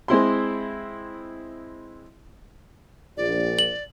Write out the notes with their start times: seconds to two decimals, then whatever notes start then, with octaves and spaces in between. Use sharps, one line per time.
0.08 G#3 C4 E4 C6
3.17 A#1 D5
3.59 F#7